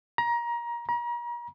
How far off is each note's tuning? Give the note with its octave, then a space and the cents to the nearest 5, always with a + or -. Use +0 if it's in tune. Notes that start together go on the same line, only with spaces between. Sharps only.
A#5 +25
A#5 +40